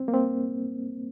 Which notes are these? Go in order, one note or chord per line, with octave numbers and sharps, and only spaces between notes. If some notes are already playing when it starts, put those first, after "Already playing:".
Already playing: C4
A#3
C4